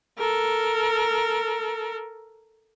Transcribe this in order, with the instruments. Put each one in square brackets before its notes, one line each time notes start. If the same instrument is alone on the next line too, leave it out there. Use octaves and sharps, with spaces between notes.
[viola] A4 A#4